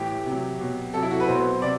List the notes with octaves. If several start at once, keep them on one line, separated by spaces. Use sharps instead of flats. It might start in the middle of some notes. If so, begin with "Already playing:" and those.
Already playing: A2 E3 G4
C3 F#3
B2 F#3
C3 F#3 A4
E4
F#4
B4
B2 F#3 C5
C3 D5